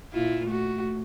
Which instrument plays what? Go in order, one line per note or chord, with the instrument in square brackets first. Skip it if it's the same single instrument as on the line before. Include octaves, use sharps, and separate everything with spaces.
[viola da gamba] A#2 E4 F4
A3 F#4